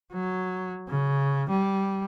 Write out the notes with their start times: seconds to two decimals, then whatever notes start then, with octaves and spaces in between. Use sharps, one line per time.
0.13 F#3
0.88 C#3
1.49 G3